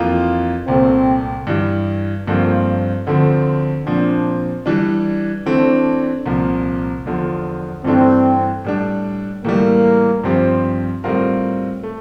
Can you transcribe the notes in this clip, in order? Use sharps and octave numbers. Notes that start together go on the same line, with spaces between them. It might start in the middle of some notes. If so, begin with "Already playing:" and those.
Already playing: F2 E3 A#3 F4
C2 A#2 A3 C4
G2 E3 G3
G2 F3 A3 A#3 C4 F4
D2 D3 F3 A3 C4
A#2 F3 C4 D4
E3 G3 D4
E3 A3 C4 D4
C2 A#2 F3
E2 D3 F3
G2 E3 A3 C4 D4
A2 G3 D4
A2 E3 G3 A#3
G2 F3 C4 G4
A2 G3 C4 F4 A#4
A3